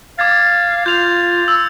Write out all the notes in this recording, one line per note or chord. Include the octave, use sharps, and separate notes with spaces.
F5 D6 G#6 A6
F4 G6 F7
E6